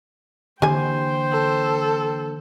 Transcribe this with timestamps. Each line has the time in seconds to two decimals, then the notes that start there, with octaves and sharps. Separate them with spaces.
0.62 D3 E3 A#3 G4 C5 G5 G#5
1.32 A4